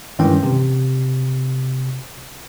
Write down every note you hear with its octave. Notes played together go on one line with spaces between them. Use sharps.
G2 D#3 E3 G#3 C#4 G5
C3